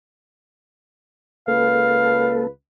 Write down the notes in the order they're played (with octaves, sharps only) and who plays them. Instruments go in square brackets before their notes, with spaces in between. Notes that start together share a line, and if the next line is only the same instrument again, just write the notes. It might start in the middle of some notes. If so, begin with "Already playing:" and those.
[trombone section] C#2 B4 [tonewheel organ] A#3 A4 [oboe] F5